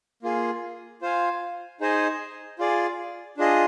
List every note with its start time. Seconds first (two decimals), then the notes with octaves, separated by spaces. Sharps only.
0.23 A#3 F4 G#4
1.02 F4 C5 F5 G#5
1.80 D#4 G#4 C5 D#5 G#5
2.59 F4 G#4 D5
3.37 D4 F4 G#4 D#5